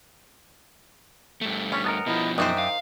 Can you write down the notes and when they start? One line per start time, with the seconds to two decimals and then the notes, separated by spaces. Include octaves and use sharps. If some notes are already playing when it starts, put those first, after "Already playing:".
1.41 G2 A3
1.72 G3 C#4
1.84 B3 A4 A#4 D#5
2.06 B2 F3 E4 D#5 E5
2.38 F#2 D#3 D4 D#4 C5 E5 G5 D#6
2.58 F5